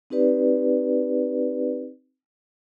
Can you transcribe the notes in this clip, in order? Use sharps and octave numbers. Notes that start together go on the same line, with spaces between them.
C4 D#4 G4 B4 D5